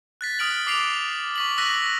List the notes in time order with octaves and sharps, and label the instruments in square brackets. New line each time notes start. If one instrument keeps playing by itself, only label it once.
[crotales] F#6 A6 B6
D#6 F6 D7 F#7
D6 D#6 C7 D7 F7
C#6 B6 F#7
C#6 E6 F#6 A#6 B6 F#7